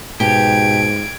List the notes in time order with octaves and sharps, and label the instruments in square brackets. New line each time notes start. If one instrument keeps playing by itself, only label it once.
[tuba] G#2 [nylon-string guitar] B2 [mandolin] G4 [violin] G#6 D7